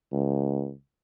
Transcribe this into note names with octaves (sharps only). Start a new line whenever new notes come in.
C#2